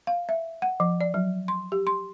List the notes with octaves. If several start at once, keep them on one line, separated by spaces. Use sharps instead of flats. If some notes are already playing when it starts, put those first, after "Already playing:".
F5
E5
F#5
F3
D5
F#3
C6
G4
C6